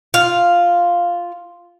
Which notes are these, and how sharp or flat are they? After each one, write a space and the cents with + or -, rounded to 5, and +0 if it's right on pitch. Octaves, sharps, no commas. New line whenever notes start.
F4 +0 F5 +0